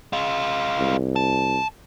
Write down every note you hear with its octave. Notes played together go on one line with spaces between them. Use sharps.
G#3 F4
C2
A5